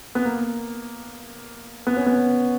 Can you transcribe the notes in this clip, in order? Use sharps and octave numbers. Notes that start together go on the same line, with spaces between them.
B3
A#3
B3
C#4
B3